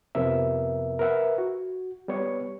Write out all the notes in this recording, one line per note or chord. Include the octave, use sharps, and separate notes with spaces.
F2 C3 F3 B3 A#4 E5
A#4 B4 E5 F#5
F#4
G3 B3 C#5 C#6